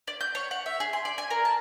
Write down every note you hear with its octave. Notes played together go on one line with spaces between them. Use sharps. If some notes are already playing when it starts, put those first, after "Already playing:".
D5
G6
C#5
F#5
E5
G#4
C6
D5
G#5
A#4
A5